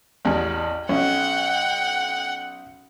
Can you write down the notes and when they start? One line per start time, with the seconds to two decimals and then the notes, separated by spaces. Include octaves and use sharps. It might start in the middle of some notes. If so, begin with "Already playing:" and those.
0.25 A1 E2
0.89 B1 C#4 F#5 G5